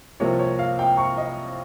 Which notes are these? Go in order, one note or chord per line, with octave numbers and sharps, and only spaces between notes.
C2 C3 F3 A#3 F4 C#5
C#5
F5
G5
C#6
D#5